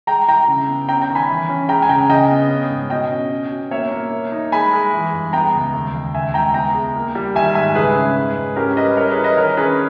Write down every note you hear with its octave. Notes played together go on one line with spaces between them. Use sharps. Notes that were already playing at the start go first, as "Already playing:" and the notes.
G#3 G5 A#5
E4 G5 A#5
C#3
B3
C#4 G5 A#5
G5 A#5
D#3
G#5 B5
E3
C#4
G#3 G5 A#5
G#5
C#3 G5 A#5
C#3 D#5 G5
B3
C#4
G#2
B2 D#5 G5
C#4
C#4
B2
A#3 C#5 E5
A#3
A#3
D#4
G#3 G#5 B5
G#3
E3
G2
B3 G5 A#5
C#2
D#2
D#2
C#2 E5 G#5
C#2 G5 A#5
B3 G5 A#5
G#3
A#3
G3
D#3 E5 G#5
G#2 E5 G#5
C#2 G#4 B4
C#4
G#2
G#2
C#4 G4 A#4
G3 B4 D#5
E4 A#4 C#5
G#4 B4
E4
B4 D#5
D#3 A#4 C#5
C#4 G#4 B4